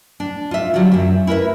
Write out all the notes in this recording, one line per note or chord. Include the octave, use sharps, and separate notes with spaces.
D4
F4 E5
D3 F#3 G3 F4 F#4
F#2 E5
E4 A#4 B4 E5